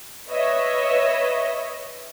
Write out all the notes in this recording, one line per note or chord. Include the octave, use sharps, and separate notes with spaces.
B4 C#5 D#5 E5